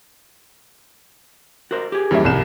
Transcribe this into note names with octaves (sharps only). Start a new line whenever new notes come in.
F#4 A#4 C5
G4 G#4
F2 E3 G3 A#3 C#4 E4
C2 E7